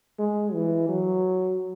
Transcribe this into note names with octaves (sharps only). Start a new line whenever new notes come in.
G#3
E3
F#3